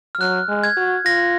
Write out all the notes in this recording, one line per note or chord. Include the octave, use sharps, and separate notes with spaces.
F6
F#3 F#6
G#3
G#6
F#4
F4 A#6